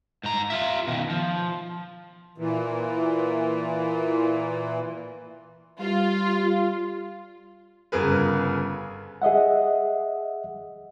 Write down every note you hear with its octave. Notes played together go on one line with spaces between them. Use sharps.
G#2 A#5
F4 E5
B2 D#3
F3
A#2 E3
G3 F4
G1 C#3 G#4 A#4 B4
G#4 D#5 E5 F#5